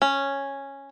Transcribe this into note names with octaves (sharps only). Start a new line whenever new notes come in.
C#4